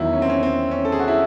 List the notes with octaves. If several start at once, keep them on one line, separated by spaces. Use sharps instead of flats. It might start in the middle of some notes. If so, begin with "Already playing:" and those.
Already playing: E2 D#3 F#3 E4
C#4
C4
C#4
C4
C#4
A4
G#4
F#4
E4